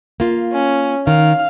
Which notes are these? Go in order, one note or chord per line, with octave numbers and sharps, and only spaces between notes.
A#3 F4
C#4
D#3 F5